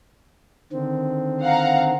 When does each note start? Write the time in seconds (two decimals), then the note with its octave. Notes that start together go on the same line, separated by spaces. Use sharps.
0.72 D3 D#3 C4
1.42 F5 F#5 A#5